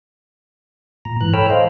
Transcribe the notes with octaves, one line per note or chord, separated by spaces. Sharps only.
A#2 A#5
G#2 E3 F#6
A4 C#5 G5 B5 E6 F6
C5 D#5 F5